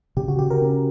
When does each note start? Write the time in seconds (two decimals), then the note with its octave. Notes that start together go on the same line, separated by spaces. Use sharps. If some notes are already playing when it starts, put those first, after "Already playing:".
0.17 C#3 G4
0.28 F#4
0.39 C#3 G4
0.50 A#4
0.61 C#4